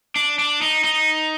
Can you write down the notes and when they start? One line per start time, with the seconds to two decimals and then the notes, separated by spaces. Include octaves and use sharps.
0.16 D4
0.39 D4
0.62 D#4
0.84 D#4